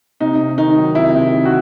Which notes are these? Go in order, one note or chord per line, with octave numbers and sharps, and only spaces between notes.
C3 D#4
C3
D#3 D#4
F#3
C3 E4
C3
D#3
F#4